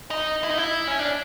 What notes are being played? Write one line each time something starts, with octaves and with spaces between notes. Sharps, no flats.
D#4
E4
D#4
E4
C#4
D4